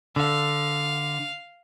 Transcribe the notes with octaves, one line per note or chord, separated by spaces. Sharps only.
D3 F5